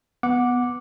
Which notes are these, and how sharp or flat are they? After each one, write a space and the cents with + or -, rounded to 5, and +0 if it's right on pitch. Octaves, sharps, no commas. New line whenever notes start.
B3 +0 F#5 -15 D6 +0